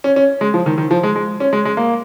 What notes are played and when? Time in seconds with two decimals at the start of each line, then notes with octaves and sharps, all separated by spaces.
0.04 C#4
0.16 C#4
0.41 G#3
0.54 F3
0.66 D#3
0.78 D#3
0.91 F3
1.03 G#3
1.16 G#3
1.40 C#4
1.53 G#3
1.65 G#3
1.77 A#3